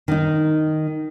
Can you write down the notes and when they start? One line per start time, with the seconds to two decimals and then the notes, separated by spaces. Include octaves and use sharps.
0.08 D#3 D#4